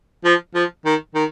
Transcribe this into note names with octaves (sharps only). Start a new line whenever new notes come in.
F3
F3
D#3
D#3